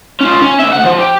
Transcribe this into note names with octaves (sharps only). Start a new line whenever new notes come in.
C#4 F4
C#4
D3 E5
D2 F#5
F3
G4